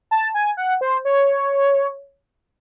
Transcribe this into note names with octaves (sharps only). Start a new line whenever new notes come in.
A5
G#5
F#5
C5
C#5